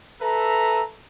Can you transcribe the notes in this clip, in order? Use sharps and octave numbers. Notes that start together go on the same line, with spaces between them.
A4 B4 E5 A#5